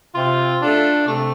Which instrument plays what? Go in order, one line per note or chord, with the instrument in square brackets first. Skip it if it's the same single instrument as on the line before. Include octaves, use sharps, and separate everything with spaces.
[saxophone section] C3 [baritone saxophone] F4
[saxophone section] A3 F4 A4 [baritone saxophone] D4
[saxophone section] C3 [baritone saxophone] A3